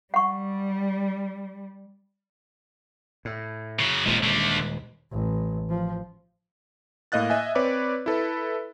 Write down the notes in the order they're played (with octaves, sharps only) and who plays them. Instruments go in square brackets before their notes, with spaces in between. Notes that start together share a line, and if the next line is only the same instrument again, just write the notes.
[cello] G3 [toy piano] F#5 C#6
[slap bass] A2
[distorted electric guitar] C#3 F#3
[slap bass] D#1 D#2 G#3 [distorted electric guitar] A#2 F3
[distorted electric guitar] D3 A3
[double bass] A1
F3
[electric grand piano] A2 A#3 D#5 F5 F#6 A6
D#5 E5 G#5
C4 B4 C#5 D5 D6
E4 A4 B4